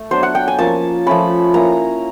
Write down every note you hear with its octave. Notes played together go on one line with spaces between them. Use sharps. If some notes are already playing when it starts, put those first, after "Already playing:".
Already playing: A3
F#3 B3 D4 C5
F#5
G5
G#5
F3 A#3 C#4 A5
F3 A3 C#4 B5
A#3 C#4 E4 A#5